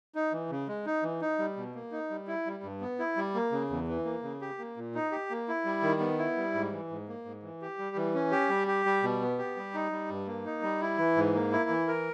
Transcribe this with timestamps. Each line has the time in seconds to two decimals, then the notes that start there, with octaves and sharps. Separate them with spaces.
0.15 D#4
0.33 E3
0.50 C#3
0.68 G#3
0.86 D#4
1.03 E3
1.21 D#4
1.39 G3
1.57 B2
1.75 A#3
1.92 D#4
2.10 G3
2.27 E4
2.46 G3
2.63 G2
2.81 B3
2.99 E4
3.17 G3
3.35 A#3
3.52 C#3
3.70 E2
3.88 E3
4.05 A#3
4.23 C#3
4.41 G4
4.58 A#3
4.77 A#2
4.95 D#4
5.12 G4
5.30 A#3
5.48 E4
5.65 G3
5.83 D#3
6.00 B3
6.18 E4
6.37 G3
6.54 G#2
6.72 E3
6.90 G#2
7.08 A#3
7.25 G#2
7.43 E3
7.61 G4
7.78 G3
7.96 E3
8.14 C#4
8.31 G4
8.49 G3
8.68 G4
8.86 G3
9.03 B2
9.21 B3
9.38 G4
9.56 G3
9.74 D#4
9.92 G3
10.10 G2
10.27 A#3
10.45 D#4
10.62 G3
10.81 E4
10.98 E3
11.16 G#2
11.34 A#3
11.52 E4
11.70 E3
11.88 A#4